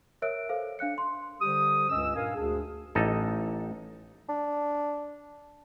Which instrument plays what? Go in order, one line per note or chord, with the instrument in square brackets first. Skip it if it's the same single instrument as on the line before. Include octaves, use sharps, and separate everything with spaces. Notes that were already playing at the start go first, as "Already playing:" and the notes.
[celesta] A#4 C#5 E5 E6 F#6 D7
A4 C5 F5
D4 F5 F#6 C#7
C6
[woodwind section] D3 G3 G4 C5 D#6
C#2 G2 C#4 D#5 E6
G2 A#2 A#4 F5 G#5
D2 D4 G#4
[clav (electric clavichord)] A1 D#4 A4
[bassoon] D4